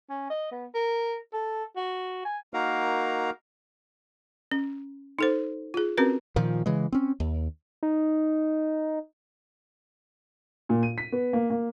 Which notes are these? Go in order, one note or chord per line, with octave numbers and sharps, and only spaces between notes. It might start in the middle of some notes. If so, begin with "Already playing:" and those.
C#4
D#5
B3
A#4
A4
F#4
G#5
A#3 D#4 F#4 A#4 F5 A#5
C#4
D#4 A4 C5
F4 G#4
C4 C#4 F#4 A#4 B4
A#2 D#3 F3
C#3 E3 G#3
C4 C#4
D#2
D#4
A#2
D#7
B6
B3
A#3
A#3